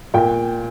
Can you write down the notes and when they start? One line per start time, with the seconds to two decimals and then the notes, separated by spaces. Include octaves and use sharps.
0.14 A#2 G5